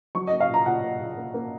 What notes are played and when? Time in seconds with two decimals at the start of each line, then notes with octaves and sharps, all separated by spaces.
0.15 F#3 C#6
0.27 A#3 D#5
0.40 F5
0.49 A#2 A#5
0.66 A#2 F#5
0.84 A#3
1.00 A#2
1.17 A#3
1.34 A#3